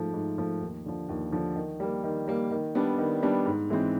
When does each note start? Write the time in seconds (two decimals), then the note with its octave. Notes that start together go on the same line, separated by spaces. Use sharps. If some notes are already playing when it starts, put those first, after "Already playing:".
Already playing: G#2 F3 A3
0.13 G#2
0.38 F3 A3
0.61 D#2
0.86 D3 F3
1.09 D#2
1.32 D3 F3
1.56 D#3
1.80 G3 A#3
2.03 D#3
2.28 G3 A#3
2.51 D#3
2.75 G3 B3 D4
2.98 D#3
3.23 G3 B3 D4
3.46 G#2
3.70 E3 G#3 C4